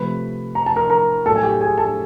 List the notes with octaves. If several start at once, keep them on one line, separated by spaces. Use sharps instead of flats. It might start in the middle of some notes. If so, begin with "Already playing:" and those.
Already playing: C3 F3 A3 B4 B5
A#5
A5
A#4 A#5
A#4 A#5
A2 F#3 A3 A4 A5
G#5
G4 G5
G#4 G#5
A4 A5